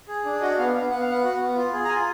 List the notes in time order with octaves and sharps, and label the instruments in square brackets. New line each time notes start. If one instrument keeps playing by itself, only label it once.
[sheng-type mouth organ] G#4
D4
F#4 D#5
B3 F5
B3 F5
B3 F#5
F5
B3 F#5
F#4
B3
F4
G#4
A#5
F4 G#5